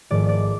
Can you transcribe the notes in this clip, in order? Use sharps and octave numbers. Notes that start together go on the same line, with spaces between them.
G#1 G#2 F3 A3 D5
D5